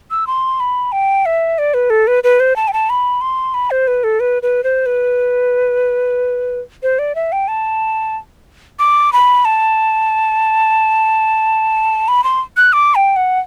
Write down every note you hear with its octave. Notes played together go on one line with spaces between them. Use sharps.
E6
C6
B5
G5
E5
D5
B4
A4
B4
B4
C5
A5
G5
A5
B5
C6
B5
C5
B4
A4
B4
B4
C5
B4
C5
D5
E5
G5
A5
D6
B5
A5
B5
C6
F#6
D6
G5
F#5